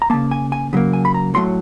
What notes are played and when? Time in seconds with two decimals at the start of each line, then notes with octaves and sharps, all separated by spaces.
0.02 A#5
0.10 C#3 F#3 A#3 A5
0.31 G#5
0.52 G#5
0.73 C#3 F#3 A#3
0.93 G#5
1.05 B5
1.14 A#5
1.34 A2 F#3 A3 C6